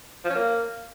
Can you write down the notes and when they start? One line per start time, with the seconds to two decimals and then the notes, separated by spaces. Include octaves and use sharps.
0.24 F3
0.30 C#4
0.36 A#3